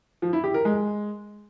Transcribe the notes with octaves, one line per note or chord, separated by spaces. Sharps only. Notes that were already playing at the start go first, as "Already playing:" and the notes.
F3
E4
G4
A#4
G#3